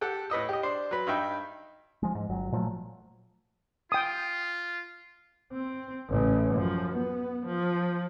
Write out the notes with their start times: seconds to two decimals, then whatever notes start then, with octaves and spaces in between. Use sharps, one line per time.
0.01 G4 A4 F#5 G5
0.30 A2 B4 D#5 E6
0.49 G4 D#5
0.63 D4 C5
0.91 F#3 B4
1.07 G2 D#4 E5 G5
2.03 F3 G#3
2.15 G#2
2.30 G1 F#3
2.52 A#2 F3 F#3 A3
3.92 F4 G5 D#6
5.53 C4
6.08 A1 C#3
6.54 F#2 F3
6.93 B3
7.46 F3